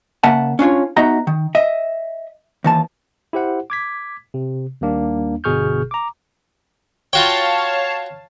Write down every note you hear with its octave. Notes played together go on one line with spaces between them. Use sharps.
C#3 A#3 E5 F#5 A5
C#4 D4 F4 C#5
B3 D#4 F#4 D#5 E5 A#5
D#3
D#5 E5
D#2 E3 A5
E4 G4 C5 F#5
D6 G#6 B6
C3
D#2 G3 A#3 D4
G1 B2 G#4 C#6 F6 G6
A#5 D6
F4 F#4 C#5 F5 G5 A5